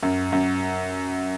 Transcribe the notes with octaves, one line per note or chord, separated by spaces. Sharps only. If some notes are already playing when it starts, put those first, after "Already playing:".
F#2
F#2